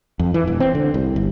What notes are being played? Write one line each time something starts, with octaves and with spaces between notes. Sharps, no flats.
F2
E3
E1
C4
D3
C2
G1